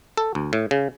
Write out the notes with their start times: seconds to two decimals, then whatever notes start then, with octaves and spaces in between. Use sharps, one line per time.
0.17 A4
0.35 D2
0.53 A2
0.71 C#3